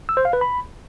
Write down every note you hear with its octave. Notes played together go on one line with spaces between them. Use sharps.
E6
C5
F5
B4
B5